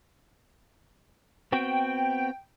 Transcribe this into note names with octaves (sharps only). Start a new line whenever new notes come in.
B3 C4 F#4 G5